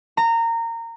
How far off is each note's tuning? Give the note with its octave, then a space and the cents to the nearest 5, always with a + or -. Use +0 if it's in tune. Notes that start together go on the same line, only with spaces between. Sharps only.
A#5 -20